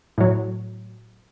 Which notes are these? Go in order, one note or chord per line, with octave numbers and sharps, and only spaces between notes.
A2 F#3